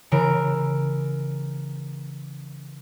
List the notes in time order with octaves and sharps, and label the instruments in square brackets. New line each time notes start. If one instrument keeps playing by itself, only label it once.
[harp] C#3 E3 A#4 D7